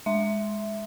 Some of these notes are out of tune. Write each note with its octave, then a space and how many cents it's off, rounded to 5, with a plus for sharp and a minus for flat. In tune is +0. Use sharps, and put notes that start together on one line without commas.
G#3 +0 E5 +0 C6 +0